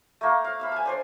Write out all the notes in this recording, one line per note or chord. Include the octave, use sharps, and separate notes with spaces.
A3 A#3
F5
E5 F5 B5
G#5 A5
D4 C5 D5